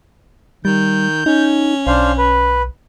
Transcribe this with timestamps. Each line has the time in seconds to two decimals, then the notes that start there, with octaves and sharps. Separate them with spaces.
0.65 D#3 G3 G6
1.26 C#4 D#4
1.87 B1 D4 C5 F5
2.18 B4